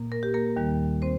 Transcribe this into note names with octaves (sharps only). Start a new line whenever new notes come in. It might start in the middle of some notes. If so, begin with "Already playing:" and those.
Already playing: A#2 A#3
A#4
G4
A#3 A#4
D#2 D#3 G3
C4 C5